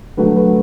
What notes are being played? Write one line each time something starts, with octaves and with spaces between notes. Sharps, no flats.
D3 F#3 A3 B4
B4